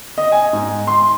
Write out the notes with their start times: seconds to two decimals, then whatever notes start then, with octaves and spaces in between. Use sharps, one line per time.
0.18 D#5
0.32 G#5
0.53 G#2
0.87 C6